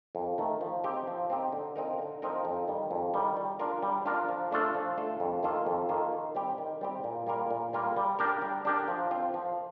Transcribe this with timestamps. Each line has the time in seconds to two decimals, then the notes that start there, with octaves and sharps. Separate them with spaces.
0.15 F2
0.38 D#3 A3
0.61 F3
0.84 C4 D#4 G4
1.07 F3
1.30 C4 D#4 G4
1.53 D3
1.76 F3 C4 D#4 A#4
1.99 D3
2.22 F3 C4 D#4 A#4
2.45 F2
2.68 D#3 G3
2.91 F2
3.14 D#3 G3
3.37 G3
3.59 D4 F4 A#4
3.82 G3
4.06 D4 F4 A#4
4.29 F3
4.51 A3 D4 F4 A4
4.75 F3
4.98 A3 D4 F4 A4
5.20 F2
5.43 D#3 A#3 F4 A4
5.66 F2
5.89 D#3 A#3 F4 A4
6.12 D#3
6.35 G3 C4 G4
6.58 D#3
6.81 G3 C4 G4
7.04 A#2
7.27 G3 A#3 F4 A#4
7.51 A#2
7.73 G3 A#3 F4 A#4
7.96 G3
8.19 D4 G4 A#4
8.42 G3
8.65 D4 G4 A#4
8.88 F3
9.11 C4 F4
9.34 F3